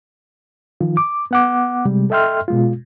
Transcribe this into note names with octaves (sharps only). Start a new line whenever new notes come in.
D#3 F3 F4
D6
B3 F#5 D6
C3 G3 G#3
A4 D#5 E5 G5 C6 F6
B2 G#3 F4